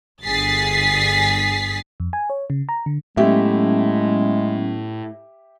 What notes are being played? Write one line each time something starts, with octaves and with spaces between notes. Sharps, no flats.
G1 G2 G#4 A6 B6 C7
F2
G#5
C#5
C#3
A#5
D3
A2 F#3 G#3 B3 C#4 G4 E5